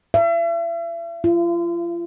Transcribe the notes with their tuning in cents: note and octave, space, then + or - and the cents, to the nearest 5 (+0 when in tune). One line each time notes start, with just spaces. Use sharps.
E5 +40
F4 -35